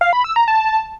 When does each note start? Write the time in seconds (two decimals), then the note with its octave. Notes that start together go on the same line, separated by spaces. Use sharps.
0.01 F5
0.13 B5
0.24 E6
0.36 A#5
0.48 A5